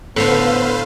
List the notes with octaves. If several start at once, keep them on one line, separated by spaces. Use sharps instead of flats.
A2 D3 B3 B4 C5 F5